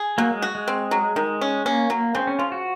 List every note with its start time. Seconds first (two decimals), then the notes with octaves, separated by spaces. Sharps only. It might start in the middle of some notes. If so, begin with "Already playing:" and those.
Already playing: G#4
0.18 F#3 A#3
0.31 G#3
0.42 F#4
0.55 G#3
0.68 C4
0.91 F#3
1.16 D#3 G#3
1.41 C#4
1.65 A#3 C#4
1.90 F#3 A#3
2.15 C#3 C4
2.27 C#4
2.39 F3 F4
2.52 F#4